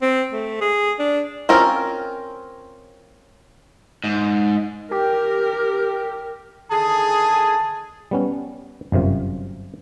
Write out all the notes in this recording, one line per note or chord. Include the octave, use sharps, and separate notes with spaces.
C4
A3
G#4
D4
C4 C#4 F4 A#4
G#2
G4 A#4
D3 D#3 G#4 A5
G3 B3 C#4
G1 F#2 C3 F4